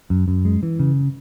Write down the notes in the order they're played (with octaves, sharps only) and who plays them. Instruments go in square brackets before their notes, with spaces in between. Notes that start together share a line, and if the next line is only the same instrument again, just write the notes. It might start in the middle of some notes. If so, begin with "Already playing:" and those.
[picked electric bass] F#2
F#2
G#3
E3
C#3